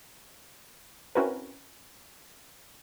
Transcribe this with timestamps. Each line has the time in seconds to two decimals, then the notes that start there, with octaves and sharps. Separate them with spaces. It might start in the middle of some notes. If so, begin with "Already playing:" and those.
1.15 C4 C#4 E4 F#4 A#4 B4